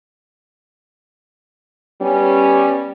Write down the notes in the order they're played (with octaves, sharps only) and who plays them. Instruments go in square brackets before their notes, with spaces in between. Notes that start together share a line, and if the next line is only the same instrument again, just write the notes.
[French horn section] G3 B3 C#4